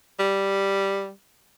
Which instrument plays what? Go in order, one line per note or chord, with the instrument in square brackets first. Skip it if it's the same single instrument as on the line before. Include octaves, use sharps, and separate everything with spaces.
[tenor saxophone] G3